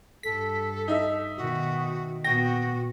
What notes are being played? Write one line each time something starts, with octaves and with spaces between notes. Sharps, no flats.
G2 A4 B6
D#4 E5
B2 D#3 F#4
A#2 B3 F#4 G5 A#6